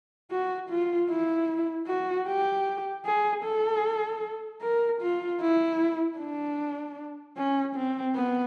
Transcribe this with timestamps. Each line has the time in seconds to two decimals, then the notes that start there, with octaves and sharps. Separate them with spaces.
0.31 F#4
0.70 F4
1.10 E4
1.87 F#4
2.27 G4
3.05 G#4
3.44 A4
4.62 A#4
5.01 F4
5.41 E4
6.18 D4
7.37 C#4
7.76 C4
8.15 B3